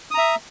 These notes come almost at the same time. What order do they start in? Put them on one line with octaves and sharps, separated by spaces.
D#6 A#5 E5